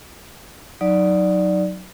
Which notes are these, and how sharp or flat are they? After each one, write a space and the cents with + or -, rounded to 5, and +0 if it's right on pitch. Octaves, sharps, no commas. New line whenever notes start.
F#3 +0 D#4 +0 D5 +0